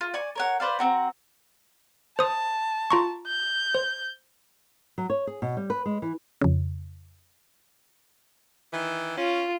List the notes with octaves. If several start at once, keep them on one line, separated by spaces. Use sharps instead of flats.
F4
D5 G#5 C#6
A#4 C#5 F#5
B4 C5 D5 F5
C4 F#4 A#5
C5 A5 D#6
F4 A#5 C#6
G6
C5
F#3
C#5
G#4
B2
G3
B4
G#3
E3
F2 C#3
D#3 E3
C#4 F4